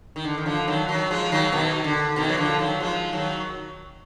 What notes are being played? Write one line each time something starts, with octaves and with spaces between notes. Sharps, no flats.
D#3
D3
D#3
D3 F3
D#3 F#3
D#3 F#3
F3 G#3
D#3 F#3
B2 D#3
D3
B2 D#3
F#3
D3 F3
D#3 F#3
F3 G#3
D#3 F#3